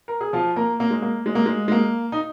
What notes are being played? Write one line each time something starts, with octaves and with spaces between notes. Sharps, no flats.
A#4
G#4
F3 F4
A#3 A#4
A#3
G#3
A#3
G#3
A#3
G#3
G#3
A#3
D#4